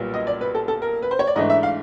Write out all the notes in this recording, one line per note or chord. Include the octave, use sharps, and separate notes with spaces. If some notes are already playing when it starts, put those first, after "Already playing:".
Already playing: B1 A#2 G3 B3
D#5
D5
B4
A4
A4
A#4
B4
C5
C#5
D5
G#2 E3 A3 D4 D#5
E5
F5